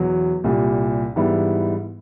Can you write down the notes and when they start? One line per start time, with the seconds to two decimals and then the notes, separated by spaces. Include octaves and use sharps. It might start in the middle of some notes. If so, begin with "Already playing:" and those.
Already playing: E2 B2 F#3
0.44 C2 A#2 G3
1.16 G#2 E3 G3 B3 E4